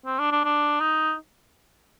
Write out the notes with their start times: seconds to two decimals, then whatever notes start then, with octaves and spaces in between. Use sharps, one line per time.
0.06 C4
0.19 D4
0.32 D4
0.44 D4
0.81 D#4